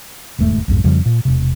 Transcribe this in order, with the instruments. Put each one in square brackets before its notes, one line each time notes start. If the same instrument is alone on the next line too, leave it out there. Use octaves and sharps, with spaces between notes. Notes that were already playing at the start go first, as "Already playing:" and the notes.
[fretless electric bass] E1 D#2 G#2 A3
B1 F2 G#2
F2 C#3 F3 G3
A#2
E1 C3